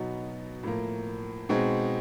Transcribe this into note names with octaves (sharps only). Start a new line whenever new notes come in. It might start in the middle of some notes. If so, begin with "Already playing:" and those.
Already playing: B2 F#3 B3 D#4
A2 F3 A#3
B2 G#3 C4 D#4 G#4